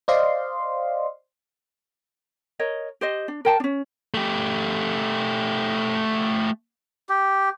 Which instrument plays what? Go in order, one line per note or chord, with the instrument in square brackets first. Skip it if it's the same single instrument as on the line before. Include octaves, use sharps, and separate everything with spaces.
[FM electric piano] C5 D5 D#5 F5 C6
[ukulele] A#4 C#5 D#5
G4 C5 D#5
D4
A#4 G5 A5
C#4 D4
[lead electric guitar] A3 G4
[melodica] G4